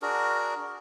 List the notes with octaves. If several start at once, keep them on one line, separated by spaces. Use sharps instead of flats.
D4 F#4 G#4 A#4